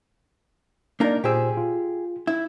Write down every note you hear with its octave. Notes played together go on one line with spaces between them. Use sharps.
A#3 D4 D#4 A#4 D5
A#2 G4 G#4 C5 E6
F4
E4